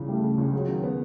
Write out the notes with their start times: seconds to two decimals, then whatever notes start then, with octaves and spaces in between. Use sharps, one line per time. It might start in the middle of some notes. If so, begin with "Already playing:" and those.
Already playing: C#2 G2 C#3 E3
0.08 G3 A3
0.24 C#3
0.38 C#2
0.52 F#3 G#3
0.69 D#3
0.83 B3